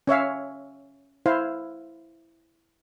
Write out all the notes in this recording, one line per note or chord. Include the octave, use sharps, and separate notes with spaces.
C#4 C#5 E5 F5
E4 C5 F5